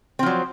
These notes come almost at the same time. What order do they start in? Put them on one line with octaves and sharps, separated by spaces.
C4 F3 F#3